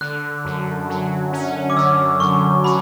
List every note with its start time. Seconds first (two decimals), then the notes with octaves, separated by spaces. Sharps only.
0.01 D3 F#6
0.45 F#2
0.89 F#3
1.32 C#4
1.70 D6
1.76 D3 E6
2.20 F#2 C#6
2.64 F#3 B5